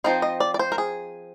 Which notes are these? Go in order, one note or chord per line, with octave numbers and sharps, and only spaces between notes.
F3 C4 D#4 C5
D#5
D5
D5
C5
A#4
G#4